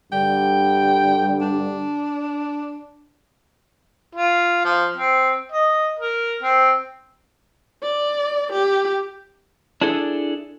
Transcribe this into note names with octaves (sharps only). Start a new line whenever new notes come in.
G2 D3 G3 G5
D4
F4
F3
C4
D#5
A#4
C4
D5
G4
D4 E4 G#4 A4